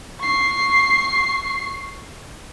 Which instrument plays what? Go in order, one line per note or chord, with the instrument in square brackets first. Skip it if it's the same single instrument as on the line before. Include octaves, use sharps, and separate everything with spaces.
[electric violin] C#6 C7